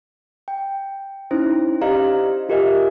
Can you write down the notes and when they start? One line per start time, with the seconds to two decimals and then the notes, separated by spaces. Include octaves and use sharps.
0.48 G5
1.31 C#4 D#4 E4 C5
1.81 G4 C5 D5 D#5 F5 A#5
2.49 F4 G4 A#4 D#5 E5 G#5